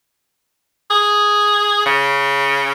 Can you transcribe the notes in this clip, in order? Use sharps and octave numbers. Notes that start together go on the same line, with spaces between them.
G#4
C#3